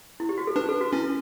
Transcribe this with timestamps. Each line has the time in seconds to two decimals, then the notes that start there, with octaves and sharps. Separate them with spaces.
0.20 E4
0.29 G4
0.38 F#4
0.47 A4
0.56 D4 B4
0.69 A4
0.81 F#4
0.93 C#4 E4